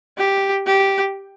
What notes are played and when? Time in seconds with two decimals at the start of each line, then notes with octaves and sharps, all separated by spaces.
0.18 G4
0.67 G4